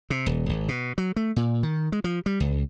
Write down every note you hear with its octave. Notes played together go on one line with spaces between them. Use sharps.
C3
D#1
G#1
B2
F#3
A3
A#2
D#3
G#3
F3
G3
C#2